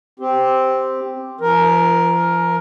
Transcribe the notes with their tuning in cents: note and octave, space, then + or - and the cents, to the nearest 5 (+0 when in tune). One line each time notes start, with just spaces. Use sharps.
C4 +0 G4 +0
F3 -35 A#4 +10